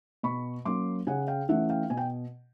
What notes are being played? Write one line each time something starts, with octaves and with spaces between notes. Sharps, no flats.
B2 B5 C#6
F#3 A#3 C#4 C6 D6
C#3 F#5 G#5
F5 G5
E3 A3 C#4 E5 F#5
F5 G5
B2 G#5
G5